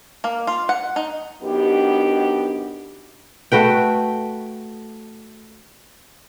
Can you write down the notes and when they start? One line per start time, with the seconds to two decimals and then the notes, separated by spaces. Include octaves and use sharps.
0.24 A#3
0.47 F4
0.69 F#5
0.96 D#4
1.43 F#2 B3 D4 D#4 G4
3.52 A3 F#4 B4 G5